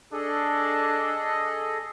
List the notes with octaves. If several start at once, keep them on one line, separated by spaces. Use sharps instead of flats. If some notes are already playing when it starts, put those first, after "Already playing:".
D4 G#4 A4 D#5